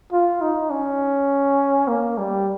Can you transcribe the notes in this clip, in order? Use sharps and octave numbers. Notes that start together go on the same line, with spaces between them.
F4
D#4
C#4
A#3
G3